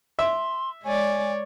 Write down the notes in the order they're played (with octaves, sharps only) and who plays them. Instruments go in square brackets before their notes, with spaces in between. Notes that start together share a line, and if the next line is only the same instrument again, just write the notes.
[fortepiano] E5 [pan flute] C6
[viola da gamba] G#3 C#5 D5 [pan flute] G#5